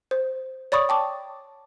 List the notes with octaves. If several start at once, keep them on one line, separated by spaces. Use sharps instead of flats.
C5
C#5 D5 B5 C#6 D#6
G5 A5 D6